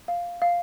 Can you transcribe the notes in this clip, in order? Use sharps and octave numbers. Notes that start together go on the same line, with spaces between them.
F5
F5